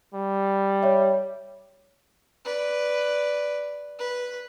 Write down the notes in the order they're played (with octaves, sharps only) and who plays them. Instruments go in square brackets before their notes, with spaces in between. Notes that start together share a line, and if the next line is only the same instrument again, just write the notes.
[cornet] G3
[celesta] C#5 E5
[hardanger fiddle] B4 D5
B4